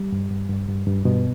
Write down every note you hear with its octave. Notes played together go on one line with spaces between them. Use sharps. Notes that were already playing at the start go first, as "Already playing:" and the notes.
Already playing: G3
G2
G2
G2
G2
G2
G2 B2 B3